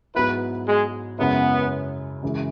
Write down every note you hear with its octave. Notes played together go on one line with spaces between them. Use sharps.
G#2 F#3 B3 E4 B4
G#3
F#2 C#3 G#3 B3 C#4 E4
F#2 C#3 E3 G#3